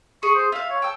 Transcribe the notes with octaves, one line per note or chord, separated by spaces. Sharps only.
G#4 C#6
C5
F4 E5 F5
C#5
G5 A5 E6